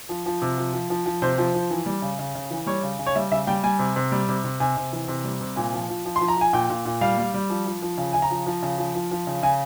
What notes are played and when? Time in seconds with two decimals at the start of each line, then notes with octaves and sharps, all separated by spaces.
0.09 F3
0.26 F3
0.42 C3
0.58 F3
0.74 F3
0.90 F3
1.06 F3
1.22 C3 C5
1.38 F3
1.54 F3
1.70 E3
1.86 G3
2.02 C#3
2.19 C#3
2.35 C#3
2.51 E3
2.66 G3 C#5
2.83 C#3
2.99 C#3
3.06 C#5
3.15 G3 E5
3.32 C#3 E5
3.47 G3 G5
3.63 G3 G#5
3.79 C3
3.96 C3
4.12 G3
4.29 C3
4.44 C3
4.60 C3 G#5
4.77 C3
4.93 E3
5.08 C3
5.25 G3
5.41 C3
5.56 A#2 G#5
5.73 F3
5.89 F3
6.05 F3
6.16 C6
6.21 F3
6.28 A#5
6.37 F3 G#5
6.53 A#2 G5
6.70 A#2
6.85 A#2
7.01 G3 F5
7.18 G3
7.34 G3
7.50 F3
7.66 F3
7.82 F3
7.98 C#3
8.13 C#3 G#5
8.22 A#5
8.31 F3
8.46 F3
8.63 C#3
8.78 F3
8.95 F3
9.11 F3
9.27 C#3
9.43 C#3 G#5